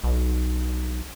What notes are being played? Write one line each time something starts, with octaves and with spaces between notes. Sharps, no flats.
B1